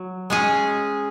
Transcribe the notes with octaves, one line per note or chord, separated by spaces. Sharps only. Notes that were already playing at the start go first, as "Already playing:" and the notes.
Already playing: F#3
G#3 C#4 G#4